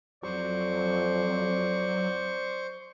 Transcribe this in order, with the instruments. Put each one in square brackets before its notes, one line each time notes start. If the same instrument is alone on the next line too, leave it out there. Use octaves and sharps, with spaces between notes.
[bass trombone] F2 [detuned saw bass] F#3 [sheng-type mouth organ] C5 C#6 [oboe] D5